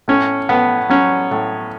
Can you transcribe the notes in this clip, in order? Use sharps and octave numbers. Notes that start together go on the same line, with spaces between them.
A2 C#4
A2 B3
F#3 C#4
A2